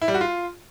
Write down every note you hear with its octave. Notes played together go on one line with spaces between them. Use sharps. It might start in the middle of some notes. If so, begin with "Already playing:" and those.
E4
G3
F#4
F4